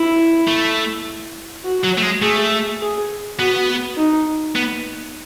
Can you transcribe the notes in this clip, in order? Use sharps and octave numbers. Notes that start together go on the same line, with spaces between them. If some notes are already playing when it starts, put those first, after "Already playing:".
Already playing: E4
A3
F#4
F#3
A3
G#3
A3 G#4
G#4
B3 F#4
D#4
B3